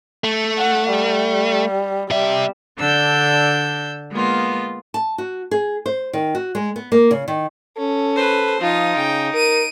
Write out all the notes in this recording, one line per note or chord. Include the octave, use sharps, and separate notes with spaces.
A3
F#5
G3
C3 G3 E5
D3 D4 E6 G6
G#3 A#3 B3 F4
A5
F#4
G#4
C5
D#3
F#4
G#3
B3
A#3
C#3
D#3
C#4 A4
B4 C5
F3 D#4 F4 D#6
C#3 G5
A#4 D7 D#7